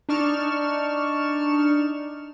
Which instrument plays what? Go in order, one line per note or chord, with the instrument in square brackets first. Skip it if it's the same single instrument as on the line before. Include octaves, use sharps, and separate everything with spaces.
[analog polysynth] D4 D#4 D5 C#6 F6 E7